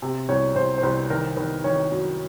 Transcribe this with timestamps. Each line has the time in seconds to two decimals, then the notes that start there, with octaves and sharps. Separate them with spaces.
0.02 C3
0.29 C2 C#5
0.55 C2 C5
0.78 C5
0.83 C2 B4
1.10 D#3 A#4
1.37 D#3 B4
1.64 D#3 C#5
1.92 F#2